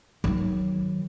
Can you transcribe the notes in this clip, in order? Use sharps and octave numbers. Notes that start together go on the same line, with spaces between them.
D#3 F#3